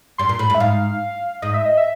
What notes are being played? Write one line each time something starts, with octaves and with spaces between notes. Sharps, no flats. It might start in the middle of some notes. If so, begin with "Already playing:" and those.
G2 C6
A#2
A2 B5
G2
E5
G#2 F5
G#2 D#5
E5
D#5
E5